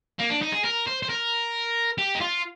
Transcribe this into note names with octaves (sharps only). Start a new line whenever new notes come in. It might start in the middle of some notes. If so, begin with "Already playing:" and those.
A#3
D4
D#4
G#4
A#4
C5
C5
A#4
G4
D#4
F4